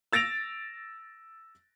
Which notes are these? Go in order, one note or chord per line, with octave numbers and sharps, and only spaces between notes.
E6 A6 A#6 D7 F7